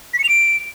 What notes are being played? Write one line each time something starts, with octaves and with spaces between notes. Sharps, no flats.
B6
C#7
F7
D7